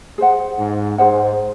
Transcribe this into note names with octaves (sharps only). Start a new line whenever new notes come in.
G#4 C5 F#5
G#2
G#2 G#4 C5 F#5